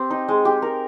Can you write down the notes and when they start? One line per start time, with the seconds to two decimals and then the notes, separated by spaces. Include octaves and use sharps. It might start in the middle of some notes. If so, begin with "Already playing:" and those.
Already playing: C4 G4
0.10 D#4
0.28 G#3
0.45 G4
0.62 A#4